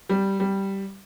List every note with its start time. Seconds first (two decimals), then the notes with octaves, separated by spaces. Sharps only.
0.09 G3
0.40 G3